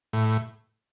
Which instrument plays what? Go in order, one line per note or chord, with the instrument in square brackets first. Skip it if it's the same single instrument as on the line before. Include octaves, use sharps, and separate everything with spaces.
[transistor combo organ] A2